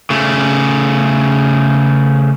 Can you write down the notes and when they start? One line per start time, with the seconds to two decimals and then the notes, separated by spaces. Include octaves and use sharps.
0.10 C#3 A3